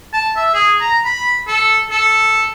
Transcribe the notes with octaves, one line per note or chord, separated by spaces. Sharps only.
A5
E5
G#4
A#5
B5
A4
A4